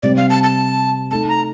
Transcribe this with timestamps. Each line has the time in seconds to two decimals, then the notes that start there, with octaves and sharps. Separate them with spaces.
0.03 C3 G3 C4 D5
0.17 F5
0.30 A5
0.43 A5
1.11 A3 D#4 A4 A5
1.29 A#5